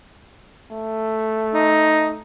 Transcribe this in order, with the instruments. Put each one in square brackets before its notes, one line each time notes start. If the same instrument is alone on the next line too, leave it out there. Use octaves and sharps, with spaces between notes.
[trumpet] A3
[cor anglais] D#4